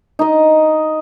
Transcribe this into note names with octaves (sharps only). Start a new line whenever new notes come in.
D#4 D#5